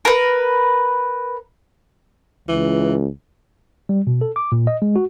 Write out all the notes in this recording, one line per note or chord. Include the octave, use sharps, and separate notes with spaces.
A#4 B4
C#2 E3
G3
B2
A4
D6
A#2
D#5
G#3
F#4